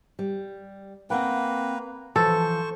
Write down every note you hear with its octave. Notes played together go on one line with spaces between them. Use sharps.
G3
A#3 C4 B4 F#5 G5
E3 F3 A4 C5 C#6